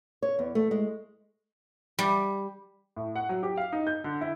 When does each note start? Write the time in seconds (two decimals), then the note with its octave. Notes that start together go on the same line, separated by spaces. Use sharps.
0.22 C#5
0.39 E2
0.55 A3
0.71 G#3
1.99 G3
2.96 A2
3.16 F#5
3.29 F#3
3.43 G4
3.57 F5
3.73 D#4
3.87 G6
4.04 D3
4.21 E4